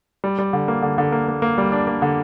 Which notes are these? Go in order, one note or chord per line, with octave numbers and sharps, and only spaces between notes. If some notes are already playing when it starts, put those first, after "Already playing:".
G3
G3
D3
A#3
D3
D3
A#3
A#3
A#3
G3
D4
A#3
D3